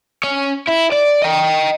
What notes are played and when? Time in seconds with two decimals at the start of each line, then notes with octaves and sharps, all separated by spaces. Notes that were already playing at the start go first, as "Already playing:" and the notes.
0.24 C#4
0.68 E4
0.92 D5
1.22 D#5 G5